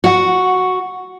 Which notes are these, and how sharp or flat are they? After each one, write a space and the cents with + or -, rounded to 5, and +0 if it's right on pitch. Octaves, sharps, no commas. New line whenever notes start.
F#4 +0 F#5 -10